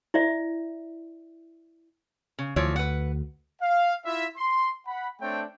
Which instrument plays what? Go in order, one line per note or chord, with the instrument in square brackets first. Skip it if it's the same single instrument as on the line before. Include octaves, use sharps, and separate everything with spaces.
[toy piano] E4 D5 E5
[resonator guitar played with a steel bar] C#3
[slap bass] D2 [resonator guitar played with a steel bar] E3 F3 C#5
[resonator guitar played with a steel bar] B4 F#5
[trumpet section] F5
E4 F4 E5
C6
F#5 B5
A3 C4 D4 C#5 G5